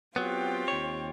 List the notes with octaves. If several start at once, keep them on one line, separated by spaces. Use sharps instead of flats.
F#3 B3 C4 F4 G4
D#2 C#5